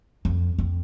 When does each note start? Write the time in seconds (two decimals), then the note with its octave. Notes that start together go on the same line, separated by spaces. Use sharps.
0.25 F2
0.59 F2